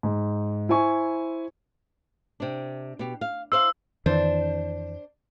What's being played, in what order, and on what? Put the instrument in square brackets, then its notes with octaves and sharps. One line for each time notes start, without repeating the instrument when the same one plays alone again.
[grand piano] G#2
E4 C5 G#5 C#6
[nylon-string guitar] C3 D4
B2 G4
F5
[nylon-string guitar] E4 C5 F5 [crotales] E6
[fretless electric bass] F2 D#3 E3 [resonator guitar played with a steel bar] D4 C5